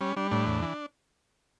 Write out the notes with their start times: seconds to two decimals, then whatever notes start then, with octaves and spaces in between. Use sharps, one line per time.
0.01 G3 C#4
0.17 G3 D4
0.31 A2 D4
0.47 E2
0.62 E3